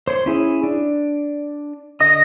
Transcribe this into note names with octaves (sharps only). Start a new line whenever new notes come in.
C5 C#5 C6
C#4 E4 G#4
D4
D3 D#5 D#6 A#6